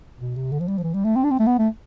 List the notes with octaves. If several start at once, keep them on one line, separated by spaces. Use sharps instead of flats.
B2
C3
D3
F3
G3
F3
E3
G3
A3
C4
D4
C4
A3
B3
A3